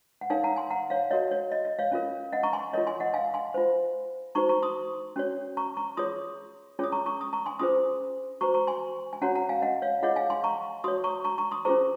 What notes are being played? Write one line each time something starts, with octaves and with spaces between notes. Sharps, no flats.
F#5
D#4 A#4 C#5 F5 G#5
F#5 A#5
G#5 C6
F#5 A#5
C#5 F5
F#4 A#4 C#5 D#5
C#5
D#5
D#5
C#5 F5
C#4 F4 A#4
D#5 F#5
A#5 C#6
G#5 C6
F4 A#4 C#5 D#5
G#5 C6
D#5 F#5
F5 G#5
G#5 C6
F4 C5
D#4 F#4 C5 A#5 C#6
A#5 C#6
C6 D#6
C#4 F#4 C#5
A#5 C#6
A#5 C#6
F4 G#4 C#5 C6 D#6
C#4 F4 G#4 C#5 D#6
A#5 C#6
A#5 C#6
D#6
A#5 C#6
G#5 C6
C#4 F4 G#4 C5 C6 D#6
F#4 C5 A#5 C#6
A#5 C#6
G#5 C6
G#5
C#4 F#4 C#5 F#5 A#5
F#5 A#5
F5 G#5
D#5 F#5
C#5 F5
F4 G#4 C#5 D#5 F#5
F5 G#5
G#5 C6
A#5 C#6
F#4 C#5 C6 D#6
A#5 C#6
A#5 C#6
A#5 C#6
C6 D#6
C#4 F4 G#4 C5 A#5 C#6